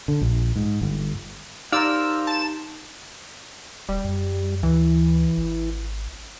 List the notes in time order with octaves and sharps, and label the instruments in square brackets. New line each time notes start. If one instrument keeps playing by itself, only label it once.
[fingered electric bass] D3
A#1
G#2
G1
[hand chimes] D#4 G4 [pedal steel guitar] A#4 C5 F5 [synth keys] D5 E6
[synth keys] A5 E7
[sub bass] E1 [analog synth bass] G3
[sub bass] F#2
[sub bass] D2 [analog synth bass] E3
[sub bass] G#1